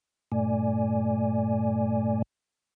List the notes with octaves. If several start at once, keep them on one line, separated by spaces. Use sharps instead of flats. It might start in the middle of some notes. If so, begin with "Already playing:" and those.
G2 A#2 A3 D5 G#5